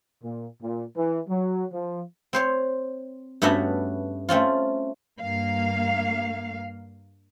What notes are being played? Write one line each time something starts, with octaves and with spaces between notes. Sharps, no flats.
A#2
A#2
E3
F#3
F3
C4 C5 C#5
G2 A3 B3 C#4 F#4 E5
A3 C4 C#4 F4
G2 A#3 F5